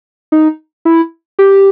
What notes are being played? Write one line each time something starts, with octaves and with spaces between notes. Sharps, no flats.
D#4
E4
G4